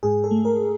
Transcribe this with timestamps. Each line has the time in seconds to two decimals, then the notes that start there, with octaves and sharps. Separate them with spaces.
0.03 G#2 G#4
0.24 A4
0.31 A3
0.45 A#4